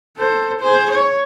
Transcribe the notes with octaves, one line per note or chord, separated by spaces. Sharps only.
A4 C5
G#4 C5
C#5